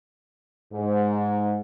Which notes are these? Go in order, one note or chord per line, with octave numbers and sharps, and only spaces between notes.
G#2